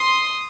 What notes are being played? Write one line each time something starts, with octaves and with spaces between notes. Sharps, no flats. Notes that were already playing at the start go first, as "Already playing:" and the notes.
Already playing: C6 D#6